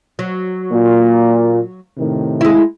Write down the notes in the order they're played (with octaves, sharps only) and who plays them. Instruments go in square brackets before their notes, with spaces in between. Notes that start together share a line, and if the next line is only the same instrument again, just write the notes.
[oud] F#3
[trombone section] A#2
A2 C3 D#3
[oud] G#3 E4